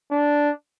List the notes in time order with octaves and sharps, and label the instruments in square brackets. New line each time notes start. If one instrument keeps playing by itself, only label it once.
[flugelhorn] D4